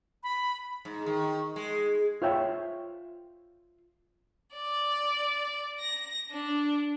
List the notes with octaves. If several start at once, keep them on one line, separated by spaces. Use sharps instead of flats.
B5
G#2
D#3
G#3
F4 C5 C#5 E5 G5
D5
A#6
D4